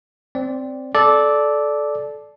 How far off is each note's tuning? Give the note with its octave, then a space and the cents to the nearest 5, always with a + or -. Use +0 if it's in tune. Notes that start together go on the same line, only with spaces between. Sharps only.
C4 +0 D5 -15
A4 -20 D5 +0